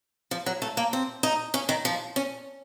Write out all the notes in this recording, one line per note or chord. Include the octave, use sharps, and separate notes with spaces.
F3
F#3
A3
A#3
C4
D#4
C#4
D#3
F3
C#4